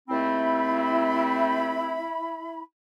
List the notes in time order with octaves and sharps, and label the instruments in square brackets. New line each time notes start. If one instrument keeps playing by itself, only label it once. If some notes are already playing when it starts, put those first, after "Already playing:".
[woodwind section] D#2 A3 C4 [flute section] E4 B5